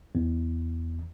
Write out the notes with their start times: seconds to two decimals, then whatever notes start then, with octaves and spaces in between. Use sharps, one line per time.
0.15 E2